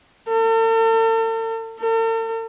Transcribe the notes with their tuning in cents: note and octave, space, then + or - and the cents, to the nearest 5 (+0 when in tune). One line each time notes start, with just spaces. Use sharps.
A4 +45
A4 +45